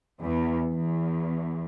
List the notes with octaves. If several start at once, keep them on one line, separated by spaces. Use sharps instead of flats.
E2
E2